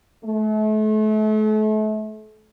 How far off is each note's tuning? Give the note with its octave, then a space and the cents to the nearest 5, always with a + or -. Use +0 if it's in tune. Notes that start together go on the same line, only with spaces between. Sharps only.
A3 -35